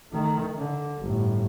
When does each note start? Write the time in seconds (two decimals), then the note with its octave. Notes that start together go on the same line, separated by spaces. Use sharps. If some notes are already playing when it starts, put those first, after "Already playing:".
0.12 D#3 A3
0.58 D3
1.02 G1 A2